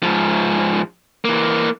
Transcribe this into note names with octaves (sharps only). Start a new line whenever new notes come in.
G#2 F3
E3 A#3